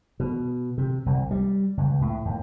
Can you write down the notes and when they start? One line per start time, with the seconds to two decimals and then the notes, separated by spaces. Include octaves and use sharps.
0.20 B2
0.78 C3
1.06 C2
1.31 G3
1.77 C#2
2.01 A2
2.25 D#2